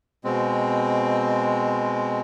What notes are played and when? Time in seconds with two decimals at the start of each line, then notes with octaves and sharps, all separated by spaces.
0.24 B2 G#3 C4